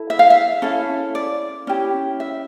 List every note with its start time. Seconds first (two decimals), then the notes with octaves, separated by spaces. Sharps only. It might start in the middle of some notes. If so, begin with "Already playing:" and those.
Already playing: E4 A4
0.10 E5
0.19 F5
0.30 E5
0.62 C#4 E4 A4
1.15 D5
1.67 C#4 E4 G4
2.20 E5